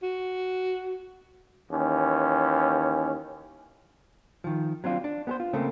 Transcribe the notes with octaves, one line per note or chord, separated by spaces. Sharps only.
F#4
D#2 E3 C#4
D#3 F3
F#3 C4 D4 F4
D4
B3 G#4 C5
F4
C#3 A3 A#3 C4